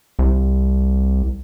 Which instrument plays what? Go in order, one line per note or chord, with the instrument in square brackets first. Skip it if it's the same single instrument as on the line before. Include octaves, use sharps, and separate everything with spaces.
[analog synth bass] C2